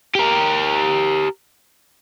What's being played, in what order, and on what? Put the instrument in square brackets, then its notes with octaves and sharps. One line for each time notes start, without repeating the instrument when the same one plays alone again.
[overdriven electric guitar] G4 A#4